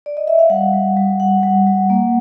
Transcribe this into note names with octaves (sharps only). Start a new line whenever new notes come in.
D5
D#5
E5
F5
G3 F#5
G3
G3
G3 F#5
G3
G3
A#3